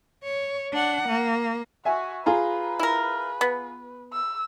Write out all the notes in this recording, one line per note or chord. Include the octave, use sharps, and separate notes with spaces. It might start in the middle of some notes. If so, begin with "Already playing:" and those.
C#5
D4 F#5
A#3
F#4 E5 G#5
F4 G#4 B4 A#5
E4 A#4
B3
E6